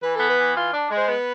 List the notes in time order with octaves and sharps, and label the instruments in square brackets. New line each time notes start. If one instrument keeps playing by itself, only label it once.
[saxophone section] E3 [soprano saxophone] B4
[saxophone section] B3 [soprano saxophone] A4
[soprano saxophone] B4
[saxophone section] E3
F4
D4
G#3
[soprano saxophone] C5
[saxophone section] B3 [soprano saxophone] B4